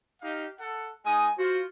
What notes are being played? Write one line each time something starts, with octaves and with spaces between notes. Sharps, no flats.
D#4 G4 F5
A4 F#5
G#3 D#4 G#5 D#6
F4 F#4 C5